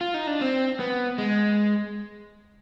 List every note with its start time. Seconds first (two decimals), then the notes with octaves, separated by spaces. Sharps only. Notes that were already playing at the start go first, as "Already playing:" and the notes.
0.01 F4
0.14 D#4
0.27 D4
0.41 C4
0.80 B3
1.18 G#3